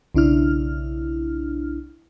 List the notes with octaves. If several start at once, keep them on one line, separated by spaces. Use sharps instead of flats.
B1 C#3 D4 E4 F6